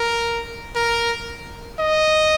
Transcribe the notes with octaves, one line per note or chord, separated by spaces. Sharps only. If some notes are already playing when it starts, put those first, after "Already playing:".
Already playing: A#4
A#4
D#5